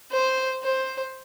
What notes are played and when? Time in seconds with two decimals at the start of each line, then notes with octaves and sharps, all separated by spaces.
0.12 C5
0.63 C5